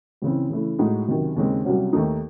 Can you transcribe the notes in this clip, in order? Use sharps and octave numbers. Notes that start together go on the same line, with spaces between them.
C#2 C#3 E3 C4
C#3 E3 A3
A2 G#3 D#4 F#4
C#2 C3 D#3 F#3
D#2 C#3 G#3 C4
C2 C3 F#3 C#4 F#4
D#2 D#3 A3 D#4